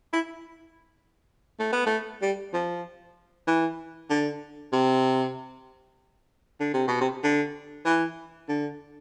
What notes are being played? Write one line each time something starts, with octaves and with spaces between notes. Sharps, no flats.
E4
A3
B3
A3
G3
F3
E3
D3
C3
D3
C3
B2
C3
D3
E3
D3